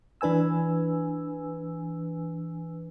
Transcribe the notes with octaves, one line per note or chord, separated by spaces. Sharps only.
E3 D4 B4 G#5 E6